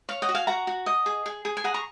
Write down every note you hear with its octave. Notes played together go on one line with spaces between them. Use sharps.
C#5 F5
D#5 F#5
F#4
F5 G#5
F#4 F#5 A#5
F#4
D#5
G#4
G#4
G#4
G#5
G#4 F#5 A#5
A#5 C#6